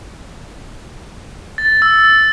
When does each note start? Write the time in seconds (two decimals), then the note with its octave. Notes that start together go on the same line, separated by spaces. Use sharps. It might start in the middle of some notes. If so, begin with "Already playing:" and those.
1.58 A6
1.82 E6